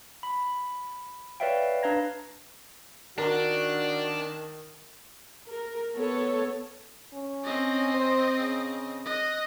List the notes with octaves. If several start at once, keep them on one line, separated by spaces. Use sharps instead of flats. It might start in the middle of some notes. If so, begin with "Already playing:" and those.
B5
B4 C#5 D5 E5 F5 G5
D4 B4 F5 A#5 G#6 A#6
D#3 D4 F#4 A#4
A#4
B3 A4 C#5
C#4
C4 D#5
C5
C#3
D#5 F#6